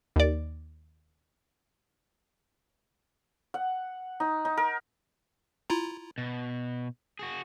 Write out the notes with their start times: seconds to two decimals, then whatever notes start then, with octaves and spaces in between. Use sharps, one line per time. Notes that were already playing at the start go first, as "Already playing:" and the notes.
0.16 D#2 D5
3.54 F#5
4.20 D#4
4.45 D#4
4.57 A#4
5.70 E4 F4 A#5
6.18 B2
7.19 F#4 G#4